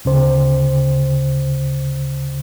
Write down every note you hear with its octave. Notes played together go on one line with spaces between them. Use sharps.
D2 C#3 C5